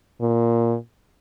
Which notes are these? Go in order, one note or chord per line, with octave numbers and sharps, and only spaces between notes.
A#2